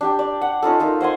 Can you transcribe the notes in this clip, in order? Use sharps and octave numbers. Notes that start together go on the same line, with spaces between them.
D4 G4 G5
D5
F#5
C#4 D#4 F4 A4
A#3 D#4 F4 A4
C5 F#5 G#5 C6